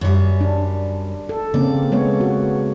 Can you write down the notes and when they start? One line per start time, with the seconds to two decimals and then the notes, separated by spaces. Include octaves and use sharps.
0.01 F#2 G3
0.41 D4
1.29 A4
1.54 C#3 A#3 C4 D5
1.92 G#3 B3 C#5
2.20 F#4